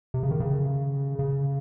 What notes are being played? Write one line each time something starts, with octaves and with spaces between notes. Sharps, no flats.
C3
C#3
D#3
C#3
C#3